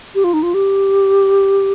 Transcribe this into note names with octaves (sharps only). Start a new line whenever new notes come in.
G4
F4
D#4
F4
G4